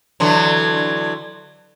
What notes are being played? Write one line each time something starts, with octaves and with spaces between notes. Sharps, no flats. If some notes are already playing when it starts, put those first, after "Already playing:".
D3 E3 F#3